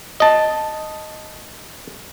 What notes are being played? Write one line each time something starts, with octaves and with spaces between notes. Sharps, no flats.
D#5 A5